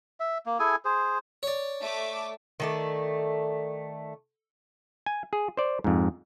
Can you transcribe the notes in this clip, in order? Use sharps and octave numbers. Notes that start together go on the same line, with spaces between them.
E5
A#3
E4 G#4 A4 G#5
G#4 C5
C#5 D5
A3 E5 D6
D#3 A3 D5
G#5
G#4
C5 D5
F2 G#2